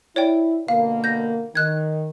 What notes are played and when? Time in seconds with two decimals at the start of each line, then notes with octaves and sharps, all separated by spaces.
0.16 E4 C#5 D5 G5
0.68 B2 D3 A#3 F5
1.04 G6 A#6
1.55 D#3 F#6 G#6